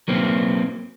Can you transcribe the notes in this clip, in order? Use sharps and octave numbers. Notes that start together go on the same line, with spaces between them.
F#3 A#3 C4